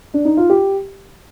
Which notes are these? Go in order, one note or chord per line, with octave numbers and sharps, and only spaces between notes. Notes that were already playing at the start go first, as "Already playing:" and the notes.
D4
D#4
F4
G4